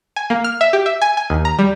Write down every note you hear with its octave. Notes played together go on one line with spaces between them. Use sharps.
G#5
A#3
F6
E5
G4
E5
G#5
G#5
D#2
A#5
G3